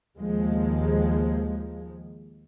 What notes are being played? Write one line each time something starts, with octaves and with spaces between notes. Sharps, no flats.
D#2 F3 G#3